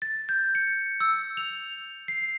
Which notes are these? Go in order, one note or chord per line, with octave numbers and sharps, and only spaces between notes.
A6
G6
C#7
E6
F7
C7